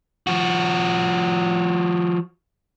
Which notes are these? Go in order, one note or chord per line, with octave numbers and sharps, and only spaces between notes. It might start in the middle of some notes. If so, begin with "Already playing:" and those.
F3 F#4